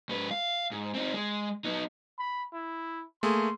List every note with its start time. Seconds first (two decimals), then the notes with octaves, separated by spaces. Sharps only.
0.09 G#2 B4
0.31 F5
0.72 G#2
0.95 C4 D#4
1.14 G#3
1.65 B3 D#4
2.18 B5
2.53 E4
3.23 A3 A#3 G#4 C6